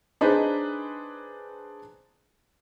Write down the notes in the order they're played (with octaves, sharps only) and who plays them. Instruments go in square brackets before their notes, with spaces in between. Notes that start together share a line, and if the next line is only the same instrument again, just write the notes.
[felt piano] D4 D#4 G#4 B4 C5 D#5